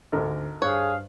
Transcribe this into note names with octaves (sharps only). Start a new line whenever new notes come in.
G#1 D2 D3 A4 A#4
G2 G#4 C5 C#5 F5 F#6